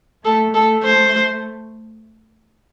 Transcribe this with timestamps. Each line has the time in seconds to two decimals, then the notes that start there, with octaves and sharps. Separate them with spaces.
0.25 A3 A4
0.54 A3 A4
0.84 C5